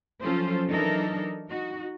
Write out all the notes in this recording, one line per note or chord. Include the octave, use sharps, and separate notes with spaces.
F3 F#3 C#4 F4 A4 C5
E3 F#3 D4 D#4 A4 A#4
D#4 F#4